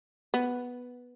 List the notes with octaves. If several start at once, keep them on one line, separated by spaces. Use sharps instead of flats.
B3